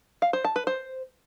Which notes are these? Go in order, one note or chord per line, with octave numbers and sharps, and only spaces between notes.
F5
C5
A5
B4
C5